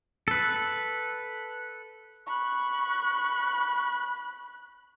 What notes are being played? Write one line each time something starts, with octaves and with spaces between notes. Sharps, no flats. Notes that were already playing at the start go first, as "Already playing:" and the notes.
A4 B4
B5 C#6 F#6